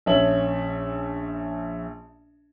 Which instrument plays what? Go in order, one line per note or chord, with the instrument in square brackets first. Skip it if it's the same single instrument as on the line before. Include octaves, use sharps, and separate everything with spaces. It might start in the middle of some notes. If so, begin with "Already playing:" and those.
[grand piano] A#1 C#4 C#5 E5 F#7